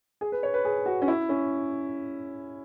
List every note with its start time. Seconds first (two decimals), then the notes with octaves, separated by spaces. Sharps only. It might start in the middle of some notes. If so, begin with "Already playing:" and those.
0.21 G#4
0.32 B4
0.43 C#5
0.54 B4
0.65 G#4
0.86 F#4
1.02 C#4
1.08 E4
1.29 C#4